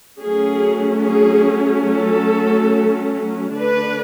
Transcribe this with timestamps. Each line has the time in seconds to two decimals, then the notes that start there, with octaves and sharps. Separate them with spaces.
0.22 F#3 A3 C#4 G#4
1.06 G#4
1.89 A4
3.56 D3 A3 D4 B4